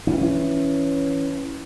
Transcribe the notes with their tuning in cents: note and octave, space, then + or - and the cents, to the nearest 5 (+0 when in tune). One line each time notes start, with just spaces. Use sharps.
E3 +0 C#4 +0